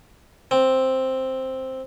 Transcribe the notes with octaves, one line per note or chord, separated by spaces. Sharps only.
C4